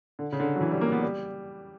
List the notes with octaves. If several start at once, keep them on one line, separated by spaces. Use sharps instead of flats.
D3
C#3
D3
F#3
E3
G3
A#3
B3
G3